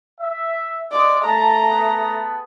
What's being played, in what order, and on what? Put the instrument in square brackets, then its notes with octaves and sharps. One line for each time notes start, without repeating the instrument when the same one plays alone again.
[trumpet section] E5
[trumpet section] G#3 [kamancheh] D5
[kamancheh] A3 A#5 [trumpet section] A5
[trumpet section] B3 G#4 A5